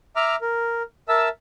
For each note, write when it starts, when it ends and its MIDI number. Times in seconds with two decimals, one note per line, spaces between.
0.16 0.36 76
0.16 0.36 82
0.16 0.36 86
0.16 0.36 89
0.41 0.83 70
1.09 1.29 70
1.09 1.29 76
1.09 1.29 81
1.09 1.29 88